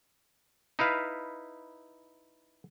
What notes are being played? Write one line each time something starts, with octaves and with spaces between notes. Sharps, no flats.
D#4 E4 B4 F5